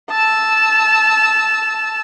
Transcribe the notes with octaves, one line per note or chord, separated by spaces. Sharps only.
A5 E6